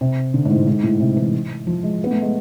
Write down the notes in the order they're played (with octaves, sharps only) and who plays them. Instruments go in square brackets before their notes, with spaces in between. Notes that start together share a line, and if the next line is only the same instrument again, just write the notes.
[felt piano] C3
D3
G#2
A2
G#2
A2
C3
E3
F3
G#3
B3
A3
G#3